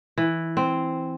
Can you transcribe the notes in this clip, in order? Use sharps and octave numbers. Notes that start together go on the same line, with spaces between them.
E3
C4